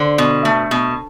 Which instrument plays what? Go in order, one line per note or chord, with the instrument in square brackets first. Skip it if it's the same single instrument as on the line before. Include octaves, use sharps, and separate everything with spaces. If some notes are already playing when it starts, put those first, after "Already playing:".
Already playing: [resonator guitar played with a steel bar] D3 C5
B2
A3
B2